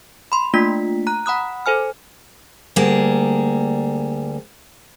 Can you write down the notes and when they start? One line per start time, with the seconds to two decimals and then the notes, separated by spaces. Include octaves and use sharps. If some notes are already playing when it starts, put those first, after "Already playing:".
0.32 B5 C6
0.54 A3 A#3 D4 F4 B6
1.07 A#5 F#6
1.26 F#5 B5 D#6 F#6
1.66 A4 C5 G#5 F6
2.76 D2 G3 A#3 G#4